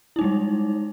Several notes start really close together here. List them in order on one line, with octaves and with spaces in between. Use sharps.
E4 D#4 G#3 G3